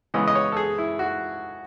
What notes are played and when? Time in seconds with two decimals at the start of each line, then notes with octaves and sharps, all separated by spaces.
0.14 C#3 E3 G#3 B3 D#5
0.28 D#5
0.35 C#5
0.52 A4
0.57 G#4
0.78 E4
0.99 F#4